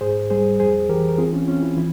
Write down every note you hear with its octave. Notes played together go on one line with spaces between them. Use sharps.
G#2 G#4 C5
G3 G#4 C5
F2 G#4 C5
E3 G4 A#4
A#4
C4 F4 G#4
C#4 F4
C4 C#4 F4
E4
E3 E4